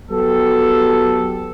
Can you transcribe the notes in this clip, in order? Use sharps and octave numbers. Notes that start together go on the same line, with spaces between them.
F#3 B3 G4 A4